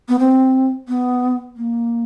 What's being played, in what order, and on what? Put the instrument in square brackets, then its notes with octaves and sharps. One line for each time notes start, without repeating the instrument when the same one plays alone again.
[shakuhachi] B3
C4
B3
A#3